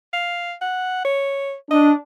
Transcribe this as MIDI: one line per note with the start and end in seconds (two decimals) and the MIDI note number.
0.13 0.54 77
0.61 1.04 78
1.05 1.54 73
1.71 1.92 62
1.71 1.91 75